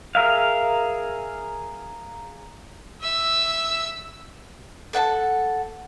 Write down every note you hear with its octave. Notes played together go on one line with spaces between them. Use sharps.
G#4 A#4 E5 F5
E5 E6
A4 F#5 G#5 A5